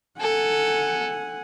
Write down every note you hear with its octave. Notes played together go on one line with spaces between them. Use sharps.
A4 F#5 G#5